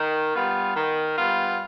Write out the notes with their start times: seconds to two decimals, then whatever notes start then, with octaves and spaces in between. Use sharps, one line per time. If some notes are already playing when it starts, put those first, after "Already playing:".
Already playing: D#3
0.34 G3 B3 F4
0.75 D#3
1.17 G3 B3 F4